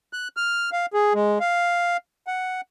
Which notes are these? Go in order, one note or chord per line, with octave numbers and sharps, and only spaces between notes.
F#6
F6
F5
G#4
G#3
F5
F#5